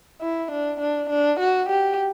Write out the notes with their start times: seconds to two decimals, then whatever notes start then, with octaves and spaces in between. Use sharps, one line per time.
0.21 E4
0.52 D4
0.80 D4
1.09 D4
1.40 F#4
1.69 G4